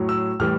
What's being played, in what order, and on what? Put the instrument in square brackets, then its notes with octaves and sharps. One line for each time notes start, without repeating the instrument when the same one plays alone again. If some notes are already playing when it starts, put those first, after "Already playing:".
Already playing: [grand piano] A2 F#3
E6
A2 E3 G3 F6